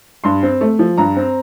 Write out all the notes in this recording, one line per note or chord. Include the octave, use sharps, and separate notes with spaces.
G2 C6
C4
A3
F3
G2 A#5
C4